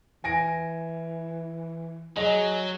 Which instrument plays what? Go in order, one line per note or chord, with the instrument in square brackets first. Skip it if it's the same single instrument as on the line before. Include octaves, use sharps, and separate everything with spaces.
[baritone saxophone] E3 [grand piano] G#5 A#6 D7
[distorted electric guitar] F#3 [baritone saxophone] G#4 [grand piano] D#5